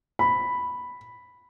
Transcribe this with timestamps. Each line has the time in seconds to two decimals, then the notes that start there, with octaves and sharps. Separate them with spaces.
0.19 B5